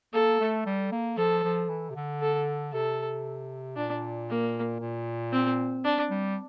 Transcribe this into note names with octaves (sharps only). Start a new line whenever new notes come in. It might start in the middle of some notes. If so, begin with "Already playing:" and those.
A#3 A4
A3
G3
A#3
F3 A4
F3
E3
C3
D3
A4
C3 A4
A#2 D4
A#3
A#2
C4
D4
G3